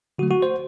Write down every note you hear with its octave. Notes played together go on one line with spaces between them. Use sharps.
D3 F#3 A3 F#4
F#4
C5